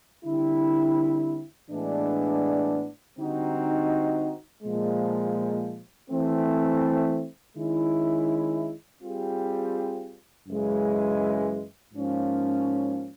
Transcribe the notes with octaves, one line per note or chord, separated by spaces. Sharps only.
D3 G3 C4 E4
A2 E3 G#3 B3 D4
D3 G3 C4 D#4 F#4
A#2 F3 G#3
E3 A3 C4
D#3 G#3 C#4 E4
G3 C4 F4 G#4
F#2 C#3 E3 G#3
G#2 F3 A#3 C#4